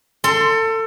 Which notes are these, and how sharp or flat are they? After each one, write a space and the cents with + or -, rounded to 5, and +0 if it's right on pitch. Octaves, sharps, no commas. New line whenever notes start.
A4 +25 C6 +0